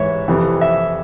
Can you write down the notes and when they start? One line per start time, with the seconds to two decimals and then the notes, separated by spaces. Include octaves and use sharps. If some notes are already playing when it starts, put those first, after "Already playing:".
Already playing: G#2 E3 C#5 E5
0.28 F2 C3 E3
0.61 E5